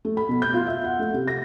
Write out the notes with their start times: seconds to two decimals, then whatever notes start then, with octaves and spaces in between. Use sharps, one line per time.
0.05 A3
0.17 B5
0.29 B2
0.42 G6
0.54 F4
0.67 E5
0.84 F#5
0.99 A3
1.13 C3
1.28 A#6